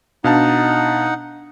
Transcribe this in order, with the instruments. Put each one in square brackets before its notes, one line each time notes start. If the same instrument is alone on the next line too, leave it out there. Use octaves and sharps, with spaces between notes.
[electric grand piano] B2 F5 A5 [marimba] D4 [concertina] D#4 F#5